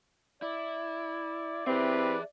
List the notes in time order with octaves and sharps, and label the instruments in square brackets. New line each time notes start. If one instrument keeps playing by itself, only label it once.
[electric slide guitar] E4 [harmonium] D5
[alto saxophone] C4 [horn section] E4 G4 B4 [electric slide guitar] G#4 E5